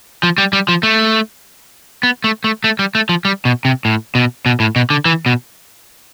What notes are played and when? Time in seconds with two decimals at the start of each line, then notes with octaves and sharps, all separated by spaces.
0.23 F3
0.38 G3
0.53 G3
0.68 F3
0.83 A3
2.03 B3
2.24 A3
2.44 A3
2.64 A3
2.79 G3
2.95 A3
3.09 F3
3.25 G3
3.45 B2
3.65 C3
3.85 A2
4.15 B2
4.46 B2
4.60 A2
4.76 B2
4.90 D3
5.05 E3
5.26 B2